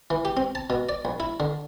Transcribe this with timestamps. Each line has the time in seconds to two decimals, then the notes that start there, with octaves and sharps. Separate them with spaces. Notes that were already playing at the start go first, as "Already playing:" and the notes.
0.10 E3
0.25 G4
0.37 C4
0.55 A5
0.70 B2
0.89 D5
1.05 A#1
1.20 E4
1.40 D3